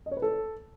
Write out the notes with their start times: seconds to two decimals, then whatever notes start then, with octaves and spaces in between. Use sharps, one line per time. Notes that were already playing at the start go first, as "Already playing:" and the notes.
0.06 D#5
0.11 C#5
0.17 B4
0.22 A4